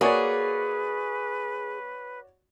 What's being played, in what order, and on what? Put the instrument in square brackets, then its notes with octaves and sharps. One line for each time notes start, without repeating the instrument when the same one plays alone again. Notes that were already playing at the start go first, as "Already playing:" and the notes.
[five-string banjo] A#3 [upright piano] F#4 C#5 D5 [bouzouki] G#4 [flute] B4